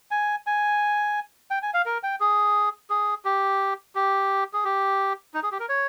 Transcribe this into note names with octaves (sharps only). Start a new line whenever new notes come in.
G#5
G#5
G5
G#5
F5
A#4
G5
G#4
G#4
G4
G4
G#4
G4
D#4
G#4
G4
A#4
C#5